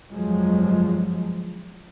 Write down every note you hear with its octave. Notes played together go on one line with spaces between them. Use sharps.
G1 F2 F3 F#3 G#3